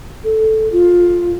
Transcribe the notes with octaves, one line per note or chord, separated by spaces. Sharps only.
A4
F4